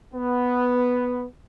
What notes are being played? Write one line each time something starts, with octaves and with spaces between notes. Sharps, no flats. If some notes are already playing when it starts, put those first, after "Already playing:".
B3